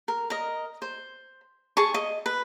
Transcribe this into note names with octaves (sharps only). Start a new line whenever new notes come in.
A#4
A#4 D#5
C5
G#4 A5 C6 C#6
D#5
B4